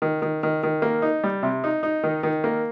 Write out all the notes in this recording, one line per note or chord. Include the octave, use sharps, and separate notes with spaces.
D#3
D#3
D#3
D#3
A#3
D#4
G3
C3
D#4
D#4
D#3
D#3
A#3